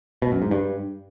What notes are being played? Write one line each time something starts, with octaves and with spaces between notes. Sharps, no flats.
B2
F#2
G#2
G2